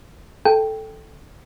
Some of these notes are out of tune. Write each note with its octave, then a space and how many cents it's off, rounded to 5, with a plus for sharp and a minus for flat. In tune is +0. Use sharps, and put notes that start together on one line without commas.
A4 -5 G5 +0